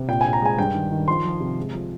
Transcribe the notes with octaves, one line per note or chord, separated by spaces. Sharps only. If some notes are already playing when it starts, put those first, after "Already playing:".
Already playing: C3
A#2 G5
A#2 G#5
A#5
G#3 G#5
G2 G5
D#3
D#3
F3 C6
F3
C3
G#3
F3